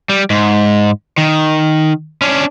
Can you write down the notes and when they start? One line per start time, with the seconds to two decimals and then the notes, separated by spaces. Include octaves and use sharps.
0.09 G3
0.30 G#2
1.18 D#3
2.22 C#4 D4